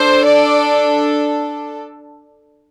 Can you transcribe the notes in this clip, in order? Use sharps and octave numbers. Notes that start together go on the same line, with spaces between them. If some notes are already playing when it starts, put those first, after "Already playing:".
Already playing: D4 A4 C5
D5